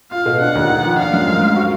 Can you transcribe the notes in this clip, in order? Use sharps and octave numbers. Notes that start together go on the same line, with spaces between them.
F4 F5
B2
D4 F#5
D#2
D#4
F3
D4 F5
F#2
G#2
G#2
F#4